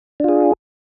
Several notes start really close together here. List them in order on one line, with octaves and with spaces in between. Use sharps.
D4 F4 G#4